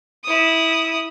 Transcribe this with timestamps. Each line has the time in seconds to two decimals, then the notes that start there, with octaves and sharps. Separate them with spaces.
0.24 E4 D#6